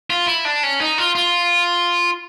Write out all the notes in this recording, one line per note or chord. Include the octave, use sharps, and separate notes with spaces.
F4
E4
D4
C#4
D#4
F4
F4